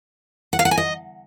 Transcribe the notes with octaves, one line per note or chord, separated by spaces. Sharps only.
F#5
F5
F#5
G#5
D#5